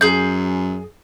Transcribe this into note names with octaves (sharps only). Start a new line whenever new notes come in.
F#2 G#4 G6